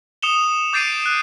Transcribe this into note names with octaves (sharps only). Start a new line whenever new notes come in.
D#6 C#7 E7 F7 G7
D6 G6 A6 C7 D7 D#7
F#6 D7